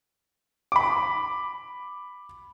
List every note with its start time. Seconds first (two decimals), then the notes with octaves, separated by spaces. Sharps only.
0.72 B5 D6